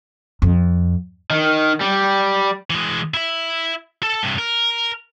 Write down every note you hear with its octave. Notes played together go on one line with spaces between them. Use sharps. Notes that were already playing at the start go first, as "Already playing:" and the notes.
F2
D#3
G3
E3 G#3
E4 E5
A4 A5
G2 C3
A#4